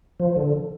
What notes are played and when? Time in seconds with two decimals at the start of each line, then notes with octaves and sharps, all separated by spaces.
0.20 F3
0.36 D3